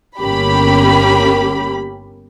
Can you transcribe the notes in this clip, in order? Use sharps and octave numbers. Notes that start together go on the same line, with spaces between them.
G1 A#3 C#4 G4 B5